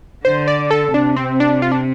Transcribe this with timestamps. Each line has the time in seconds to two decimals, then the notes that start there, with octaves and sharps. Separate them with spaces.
0.25 D3 C5
0.48 D5
0.71 A4
0.94 C3 D4
1.16 C4
1.40 D4
1.62 F4
1.72 D4